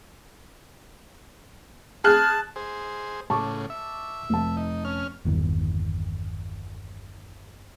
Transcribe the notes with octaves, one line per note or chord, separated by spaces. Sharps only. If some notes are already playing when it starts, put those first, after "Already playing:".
G#4 A5 F6 F#6
G#4 C5
A2 C#3 A5 C#6 D6
E5
F1 A5
D#4
C#4 F6
G1 E2 D#3